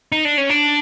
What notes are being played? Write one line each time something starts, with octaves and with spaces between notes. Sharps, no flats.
D#4
D4
C#4
D4